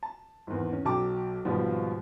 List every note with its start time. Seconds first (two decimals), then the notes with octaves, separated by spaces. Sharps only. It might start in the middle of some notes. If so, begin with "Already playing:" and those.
0.03 A5
0.47 G#1 E2
0.73 C#4
0.85 B1 F#3 G5 A5 D6
1.45 D#2 G#2 B2 F3 G3